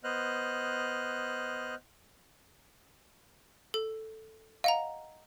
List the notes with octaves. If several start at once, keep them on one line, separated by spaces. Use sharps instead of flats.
B3 C5 D#5 F6 F#6
A4
D#5 F5 F#5 A#5